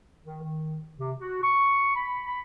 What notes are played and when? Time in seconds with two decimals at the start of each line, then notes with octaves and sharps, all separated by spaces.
0.24 D#3
0.42 D#3
0.98 C3
1.19 F#4
1.43 C#6
1.95 B5
2.26 B5